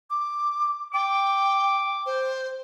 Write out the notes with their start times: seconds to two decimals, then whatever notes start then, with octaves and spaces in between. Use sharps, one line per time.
0.10 D6
0.94 G5 D6
2.06 C5